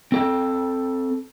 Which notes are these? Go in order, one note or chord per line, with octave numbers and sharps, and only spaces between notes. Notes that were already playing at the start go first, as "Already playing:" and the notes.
C4 A4 G5